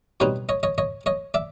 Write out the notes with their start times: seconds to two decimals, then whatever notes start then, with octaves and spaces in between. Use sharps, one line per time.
0.20 B2 G3 C4 D#4 B4 C#5
0.49 C#5 D#5
0.63 C#5 D#5
0.78 C#5 D#5
1.06 C#5 D#5
1.34 D5 E5